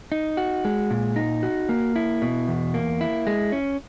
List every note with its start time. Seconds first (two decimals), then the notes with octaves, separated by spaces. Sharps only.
0.12 D#4
0.37 F#4
0.65 G#3
0.91 A#2
1.16 D#4
1.43 F#4
1.69 A#3
1.96 E4
2.22 B2
2.48 E2
2.74 A#3
3.01 E4
3.27 G#3
3.52 C#4